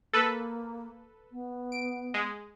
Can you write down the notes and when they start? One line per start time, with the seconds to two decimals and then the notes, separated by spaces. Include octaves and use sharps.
0.13 A#3 A4 B4
1.31 B3
1.72 D7
2.14 G#3